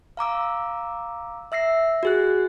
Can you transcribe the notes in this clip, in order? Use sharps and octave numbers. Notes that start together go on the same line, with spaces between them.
F5 A#5 D6 E6
E5 E6 A#6 C7
F#4 G#4 F#6